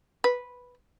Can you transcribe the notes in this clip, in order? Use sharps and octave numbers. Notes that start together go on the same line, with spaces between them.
B4